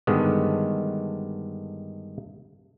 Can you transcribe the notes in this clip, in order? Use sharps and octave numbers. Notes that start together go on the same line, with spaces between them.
G2 D3 D#3 G#3 B3